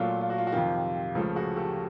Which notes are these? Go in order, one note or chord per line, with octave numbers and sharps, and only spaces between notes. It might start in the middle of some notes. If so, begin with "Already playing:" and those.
Already playing: A#2 F#3 A3 F4
F4
F#4
F4
F#4
F2 C3 D#3 F4 G4
C#2 C#3 F3 A3
F#4 G#4
G4 A4